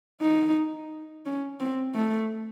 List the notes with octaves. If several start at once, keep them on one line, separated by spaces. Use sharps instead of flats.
D#4
C#4
C4
A3